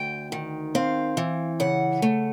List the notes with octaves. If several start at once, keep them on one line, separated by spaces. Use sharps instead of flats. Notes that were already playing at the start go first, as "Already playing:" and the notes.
Already playing: D2 G5
D#3
C4 F5
E3
C#3 F#5
A3